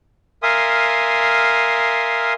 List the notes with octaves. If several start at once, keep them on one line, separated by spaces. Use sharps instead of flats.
A#4 E5 F5 G#5 C6 D#6